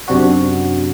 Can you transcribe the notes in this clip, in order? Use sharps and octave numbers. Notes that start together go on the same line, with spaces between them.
F#2 C3 D4 F#4